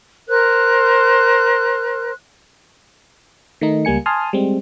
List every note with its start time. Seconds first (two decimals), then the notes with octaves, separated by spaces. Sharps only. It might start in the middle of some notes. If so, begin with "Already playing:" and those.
0.28 A#4 C5 F#6
3.61 D#3 A3 D#4
3.85 C#2 G3 A#3 G#5 C#7
4.06 G#5 A5 C6 D#6 F6
4.33 G3 G#3 C4